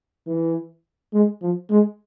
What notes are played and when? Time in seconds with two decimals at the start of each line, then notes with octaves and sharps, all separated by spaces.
0.27 E3
1.14 G#3
1.42 F3
1.70 G#3